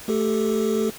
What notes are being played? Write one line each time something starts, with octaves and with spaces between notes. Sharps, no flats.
A3 G4 A4